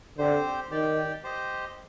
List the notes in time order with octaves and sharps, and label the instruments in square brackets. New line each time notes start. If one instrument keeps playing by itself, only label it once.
[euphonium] D3 [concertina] C4 G4 C5
[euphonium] D#3 [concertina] G4 D5 G5
[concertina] G4 C5 D#5